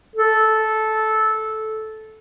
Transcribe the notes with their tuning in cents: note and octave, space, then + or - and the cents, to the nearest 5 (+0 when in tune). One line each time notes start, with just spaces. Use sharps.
A4 -10